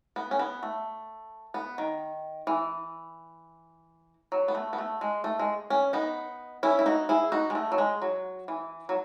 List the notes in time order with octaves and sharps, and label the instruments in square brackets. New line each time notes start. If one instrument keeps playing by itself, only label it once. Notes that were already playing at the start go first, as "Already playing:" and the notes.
[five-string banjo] B3
C#4
B3
A3
B3
D#3
E3
F#3
B3
A3
B3
A3
G#3
A3
G#3
C#4
B3 D#4
C#4 E4
E4
D#4 F#4
E4 G#4
D#4 F#4
G#3
A3
F#3
G#3
F#3
E3
F#3